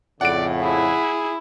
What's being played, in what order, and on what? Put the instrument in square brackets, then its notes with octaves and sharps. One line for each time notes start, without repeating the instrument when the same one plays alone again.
[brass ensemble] F2 A2 C#3 [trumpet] D5 [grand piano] F#5 D7
[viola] E4 [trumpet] G#4